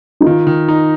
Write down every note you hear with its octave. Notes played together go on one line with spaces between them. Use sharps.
D#4
D#3 F4
D#3
D#4